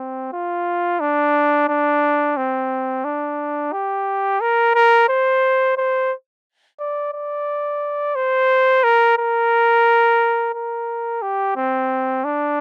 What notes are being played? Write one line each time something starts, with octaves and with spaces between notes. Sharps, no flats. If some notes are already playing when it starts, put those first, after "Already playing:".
Already playing: C4
F4
D4
D4
C4
D4
G4
A#4
A#4
C5
C5
D5
D5
C5
A#4
A#4
A#4
G4
C4
D4